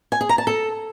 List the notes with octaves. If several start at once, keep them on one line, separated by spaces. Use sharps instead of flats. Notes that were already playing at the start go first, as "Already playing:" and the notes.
G#5
G#4
A#5
A5
A4